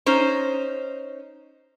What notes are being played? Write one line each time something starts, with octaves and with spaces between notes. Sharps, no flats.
C#4 D#4 C5